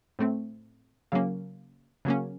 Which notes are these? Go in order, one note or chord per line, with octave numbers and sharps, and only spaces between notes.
A2 A3 C4
C#3 F#3 A#3 C#4 F5
C#3 F#3 A#3 C#4